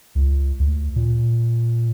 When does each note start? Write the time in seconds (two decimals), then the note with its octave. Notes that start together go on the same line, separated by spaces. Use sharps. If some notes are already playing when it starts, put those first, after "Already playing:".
0.15 C#2
0.60 D2
0.96 A#2